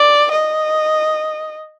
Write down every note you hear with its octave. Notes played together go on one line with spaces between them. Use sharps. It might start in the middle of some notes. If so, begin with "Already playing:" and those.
Already playing: D5
D#5